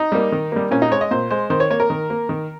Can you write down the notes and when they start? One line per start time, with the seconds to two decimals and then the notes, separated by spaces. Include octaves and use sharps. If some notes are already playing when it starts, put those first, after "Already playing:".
Already playing: D#4
0.12 G3 A#3
0.32 D#3
0.52 G3 A#3
0.71 A#2 C#4
0.82 D#4
0.91 G#3 C#5
1.01 D#5
1.11 A#2 C5
1.31 G#3 C5
1.50 D#3 C5
1.60 C#5
1.70 A#3 C#5
1.80 A#4
1.90 D#3
2.10 A#3
2.29 D#3